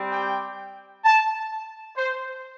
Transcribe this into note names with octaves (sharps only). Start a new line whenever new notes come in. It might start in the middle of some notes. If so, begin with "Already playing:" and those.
Already playing: G3 C4 G4
G5
A5
C5